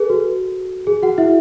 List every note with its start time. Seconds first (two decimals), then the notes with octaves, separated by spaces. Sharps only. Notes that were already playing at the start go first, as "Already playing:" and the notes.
Already playing: G#4 A4 B4
0.09 F#4
0.87 G#4
1.02 F#4 F#5
1.18 E4 E5